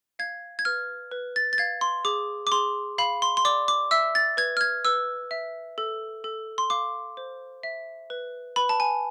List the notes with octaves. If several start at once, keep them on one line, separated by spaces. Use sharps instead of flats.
F5 G#6
G#6
B4 F6
B4
A6
A6
F5 G#6
C6
G#4 D6
D6
G#4 C6
F5 B5
C6
C6
D5 D6
D6
E5 E6
A6
B4 G#6
F6
G#6
B4 E6
E5
A4
A4
C6
F5 D6
C5
E5
B4
B4 B5
A5
G#5